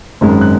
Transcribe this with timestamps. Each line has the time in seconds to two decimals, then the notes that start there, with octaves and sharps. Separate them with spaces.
0.21 G#1 F#2 D#3 G#3
0.41 F#6